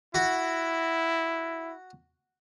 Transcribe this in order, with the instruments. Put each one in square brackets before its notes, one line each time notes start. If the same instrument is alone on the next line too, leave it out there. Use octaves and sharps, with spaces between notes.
[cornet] E4 [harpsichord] F#4